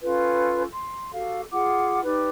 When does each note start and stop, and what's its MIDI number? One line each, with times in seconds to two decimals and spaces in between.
0.01 0.63 61
0.01 0.63 65
0.01 0.63 69
0.01 0.63 71
0.71 1.10 84
1.12 1.41 66
1.12 1.41 67
1.12 1.41 69
1.12 1.41 77
1.51 2.02 65
1.51 2.02 68
1.51 2.02 78
1.51 2.02 86
2.03 2.29 63
2.03 2.29 67
2.03 2.29 71
2.03 2.29 74